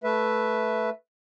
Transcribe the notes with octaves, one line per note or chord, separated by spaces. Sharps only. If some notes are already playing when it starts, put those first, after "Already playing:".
A3 B4 E5